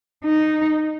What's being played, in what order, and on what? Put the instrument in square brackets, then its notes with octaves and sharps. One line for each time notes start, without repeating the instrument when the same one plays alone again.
[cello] D#4